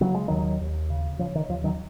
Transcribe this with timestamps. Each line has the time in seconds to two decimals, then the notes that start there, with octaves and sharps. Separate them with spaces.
0.01 C#3 F#3
0.14 G#3
0.28 D#2 D#3 F#3
0.61 D#2
0.90 C#3
1.19 C#3 F3
1.35 D#3
1.49 D#2 F3
1.64 D#3 F#3